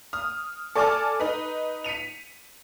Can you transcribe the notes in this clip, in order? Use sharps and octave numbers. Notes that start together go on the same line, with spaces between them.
D#6 F6
A4 D5 G#5 A5 D6 F6
D#4 B4
B6 C#7 D#7 F7